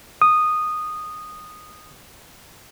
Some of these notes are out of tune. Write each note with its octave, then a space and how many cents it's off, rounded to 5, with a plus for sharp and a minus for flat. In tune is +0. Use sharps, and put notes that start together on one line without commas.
D#6 -10